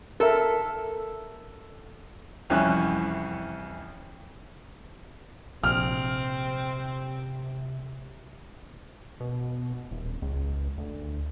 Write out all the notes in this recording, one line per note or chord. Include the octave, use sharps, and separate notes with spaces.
A4 A#4 E5
C2 F2 E3 C#4 E5 F#6
A#1 C3 C4 F6
B2
D#1
C#2
D2